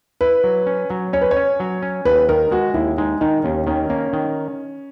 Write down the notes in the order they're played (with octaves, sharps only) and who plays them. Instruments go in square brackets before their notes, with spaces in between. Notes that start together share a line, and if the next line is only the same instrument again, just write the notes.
[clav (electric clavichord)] E4 [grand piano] B4
[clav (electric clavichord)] F#3
C#4
F#3
[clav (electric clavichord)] C#4 [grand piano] C#5
[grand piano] B4
C#5
[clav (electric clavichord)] C#4
F#3
C#4
[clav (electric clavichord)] D#2 [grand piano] B4
[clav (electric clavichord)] D#3 [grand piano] A#4
[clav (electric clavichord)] G#3 [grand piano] F#4
[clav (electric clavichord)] D#2 [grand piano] E4
[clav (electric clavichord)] G#3 [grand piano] D#4
[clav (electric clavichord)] D#3 [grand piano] D#4
[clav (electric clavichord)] D#2 [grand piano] C#4
[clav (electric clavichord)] D#3 [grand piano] C#4
[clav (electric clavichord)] A#3 [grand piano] C#4
[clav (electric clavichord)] D#3